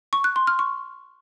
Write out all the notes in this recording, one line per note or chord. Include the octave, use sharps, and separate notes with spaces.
C#6
F#6
C6
F6
C#6